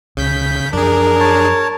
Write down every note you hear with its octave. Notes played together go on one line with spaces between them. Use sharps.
C#2 C#3 G6 B6
F#2 F3 D4 G#4 A#4
C#5 A5